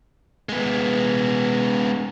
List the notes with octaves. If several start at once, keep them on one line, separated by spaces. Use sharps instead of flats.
G#3 B3